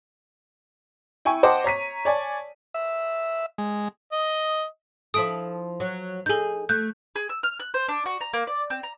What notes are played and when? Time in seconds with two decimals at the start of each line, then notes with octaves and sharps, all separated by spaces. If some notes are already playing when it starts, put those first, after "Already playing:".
1.25 E4 G5 G#5 C#6
1.43 C5 D#5 F#5 G5 A5 D6
1.64 C#5 A#5 B6 D#7
2.05 C#5 D5 G#5 A5
2.74 E5
3.58 G#3
4.12 D#5
5.14 F3 E4 A4 D#6 D7
5.80 F#3
6.26 D#4 G#4 A4 G6
6.69 A3 F#6 G6
7.16 G#4
7.29 E6
7.43 F6
7.60 F#6
7.74 C5
7.88 D4
8.06 F#4
8.21 A#5
8.33 A#3
8.47 D5
8.70 C4
8.83 A#5